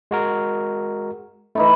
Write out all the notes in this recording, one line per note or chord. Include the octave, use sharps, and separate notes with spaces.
G#3 F#4 A#4
E3 A3 D#4 E4